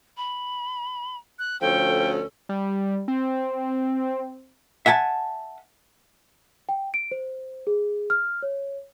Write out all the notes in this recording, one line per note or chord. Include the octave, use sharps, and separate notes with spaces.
B5
F#6
D2 F3 C#4 A4 G5
G3
C4
E5 F#5 G#5 A5
G5
D7
C5
G#4
F6
C#5